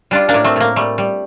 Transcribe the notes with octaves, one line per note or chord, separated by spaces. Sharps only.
G3 D4 F4
A#3 D4
A2
A3 C4
A2 A#3
G3 A3
G3